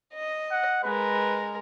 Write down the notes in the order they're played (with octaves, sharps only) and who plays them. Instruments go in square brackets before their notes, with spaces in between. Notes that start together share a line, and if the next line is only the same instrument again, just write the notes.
[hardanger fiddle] D#5
[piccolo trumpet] F#5
[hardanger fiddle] G#3 A#4 [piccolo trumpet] B4